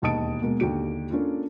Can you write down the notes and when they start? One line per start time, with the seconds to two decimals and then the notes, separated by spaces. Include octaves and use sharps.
0.02 E1 D#2 D#5 A5 D#6 D7
0.41 B2 G#3 A#3
0.60 D#2 D3 G4 D7
1.10 A#3 C#4 D4 F4 A4